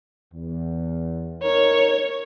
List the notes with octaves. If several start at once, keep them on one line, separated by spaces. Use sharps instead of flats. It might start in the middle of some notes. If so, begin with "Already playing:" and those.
E2
D#4 A#4 C#5